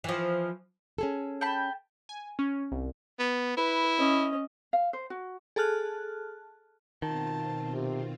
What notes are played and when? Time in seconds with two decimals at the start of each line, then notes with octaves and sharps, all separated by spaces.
0.04 E3 F3
0.98 C#4 G#4 A4
1.41 G5 A5 B5
2.09 G#5
2.39 C#4
2.72 C2
3.19 B3
3.57 E4 B4
3.98 C#4 D#5
4.73 F5
4.93 C5
5.10 F#4
5.56 G#4 A4 A5 F6 F#6
7.02 B2 D#3 C4 F4 A5
7.74 C3